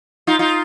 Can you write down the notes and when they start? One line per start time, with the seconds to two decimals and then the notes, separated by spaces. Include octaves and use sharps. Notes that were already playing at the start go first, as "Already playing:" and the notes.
0.27 D#4 F4
0.39 D#4 F4